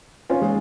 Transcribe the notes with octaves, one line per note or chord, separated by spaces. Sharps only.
C#4 F4
G#3